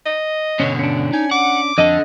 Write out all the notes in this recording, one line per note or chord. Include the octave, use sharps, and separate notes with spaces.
D#5
B2 D3 C#4 C5 C#5
C#4 D4
D#4 G#5
F#5 D6
F2 D3 A4 D#5